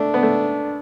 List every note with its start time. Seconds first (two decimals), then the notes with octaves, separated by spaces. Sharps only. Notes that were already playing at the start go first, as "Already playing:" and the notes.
Already playing: A3 D4
0.14 B3
0.23 A3